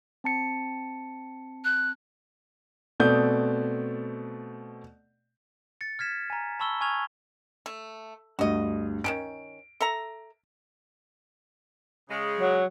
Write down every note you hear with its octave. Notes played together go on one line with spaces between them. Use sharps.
C4 A5 C#7
F#6
B2 A3 C4 D5 D#6 G6
A6 C#7
F6 G#6 B6 E7
G#5 A#5
A5 B5 C#6 E6 F#7 G7
G#5 C#6 F6 G#6 F7
A3
D2 G2 F#4 D#5
D#3 F#3 C#4 D7
A4 E5 A#5
C#3 G#3
F#3